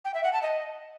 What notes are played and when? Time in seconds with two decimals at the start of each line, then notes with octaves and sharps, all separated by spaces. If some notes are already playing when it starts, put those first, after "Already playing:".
0.05 G5
0.14 E5
0.23 F#5
0.33 A5
0.42 D#5